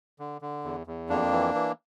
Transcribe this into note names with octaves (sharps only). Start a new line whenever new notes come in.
D3
D3
E2
E2
F2 A#3 D4
E3
E3